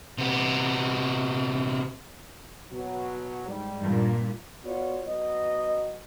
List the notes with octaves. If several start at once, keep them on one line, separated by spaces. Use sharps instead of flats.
C3 B3
B2 F#3
G#2 G3
G2 A#2
B3 F4 F#4 C#5 D5
F#3 B3 D#5